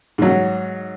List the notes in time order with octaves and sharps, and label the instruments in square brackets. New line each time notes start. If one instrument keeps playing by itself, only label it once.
[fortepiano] G#2 F#3